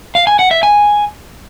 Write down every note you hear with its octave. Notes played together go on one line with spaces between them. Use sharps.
F5
G#5
F#5
E5
G#5